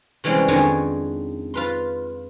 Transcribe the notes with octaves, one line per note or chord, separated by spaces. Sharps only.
C3 E3 G3 G#3 C4 C#4
F2 D#3 G#3 D4 C#5 G#5
F4 B4 C6